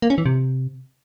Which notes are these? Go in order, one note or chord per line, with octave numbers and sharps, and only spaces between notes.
A#3
C#4
E3
C3